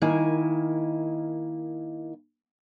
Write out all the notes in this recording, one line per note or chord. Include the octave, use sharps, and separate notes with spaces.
D#3 A#3 E4 G#5